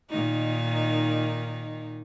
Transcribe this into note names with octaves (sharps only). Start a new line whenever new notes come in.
A#2 D#3 D#4